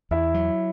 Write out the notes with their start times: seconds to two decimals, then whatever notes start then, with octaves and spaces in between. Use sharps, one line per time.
0.11 E2 E4 E5
0.34 F#3